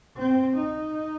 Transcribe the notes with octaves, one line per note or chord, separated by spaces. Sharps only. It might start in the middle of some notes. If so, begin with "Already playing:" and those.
C4
D#4